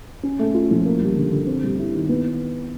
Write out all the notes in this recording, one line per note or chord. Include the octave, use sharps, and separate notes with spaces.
C#4
A3
F4
F3
A#3
G3
D3
D3
C4
G3
E4
D#3
B3